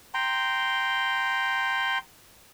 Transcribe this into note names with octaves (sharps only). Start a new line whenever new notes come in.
G5 A#5 C6